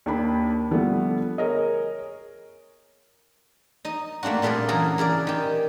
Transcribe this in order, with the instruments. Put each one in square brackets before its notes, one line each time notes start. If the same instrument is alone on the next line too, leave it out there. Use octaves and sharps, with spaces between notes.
[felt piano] D#2 D4 B5
D3 F3 G3 A3 B3
G#4 A#4 C#5 D#5
[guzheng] D#4 D#5
A3 A#3 C4 D4 F#4
A#2 G3 A3 F4 G#4 D5
C#3 E3 F#3 G#4 A#4 A#5
E3 G#4 A#4 D5
D#3 G4